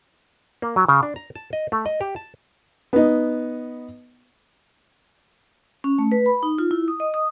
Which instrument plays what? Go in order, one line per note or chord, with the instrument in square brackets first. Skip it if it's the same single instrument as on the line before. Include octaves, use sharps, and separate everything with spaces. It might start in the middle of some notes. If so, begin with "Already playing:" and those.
[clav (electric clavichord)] A#3
F#3
C#3
D4
A#5
A5
D#5
A3
D#5
G4
A5
[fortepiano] B3 D#4
[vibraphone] C#4
A3
B4
B5
D#4
F4
E4
D#6
D#5
D#6